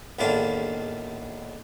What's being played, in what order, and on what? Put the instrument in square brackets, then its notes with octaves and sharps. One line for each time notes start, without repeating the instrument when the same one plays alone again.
[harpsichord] A#1 E2 A2 D#3 D4 F4